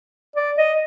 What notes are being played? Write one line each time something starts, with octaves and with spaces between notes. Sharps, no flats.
D5
D#5